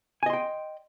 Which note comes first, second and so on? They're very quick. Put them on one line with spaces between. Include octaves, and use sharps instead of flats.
G#5 D#5 C6 G5